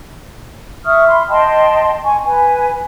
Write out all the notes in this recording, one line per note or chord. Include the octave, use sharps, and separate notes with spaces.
E5 C#6 D#6 F6
B5 C6
D#5 G5 A5 C6
G#5 C#6
B4 G#5